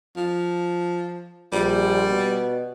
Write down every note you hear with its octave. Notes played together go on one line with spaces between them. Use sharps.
F3
A#1 G3
B2